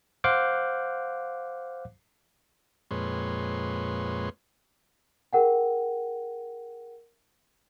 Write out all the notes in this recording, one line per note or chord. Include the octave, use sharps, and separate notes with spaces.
C5 F5 F#5 D6 F#6 G6
F2 A#2 G#3 B4 C#5 C6
G#4 A#4 F#5 G5